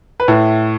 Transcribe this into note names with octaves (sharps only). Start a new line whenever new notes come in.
B4
A2